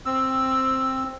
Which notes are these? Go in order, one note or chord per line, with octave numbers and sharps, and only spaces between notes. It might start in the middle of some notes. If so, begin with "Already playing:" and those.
C4 E6